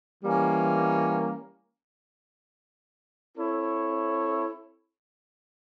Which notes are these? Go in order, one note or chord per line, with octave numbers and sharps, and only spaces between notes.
E3 G3 A#3 C#4
C4 E4 A4 C#5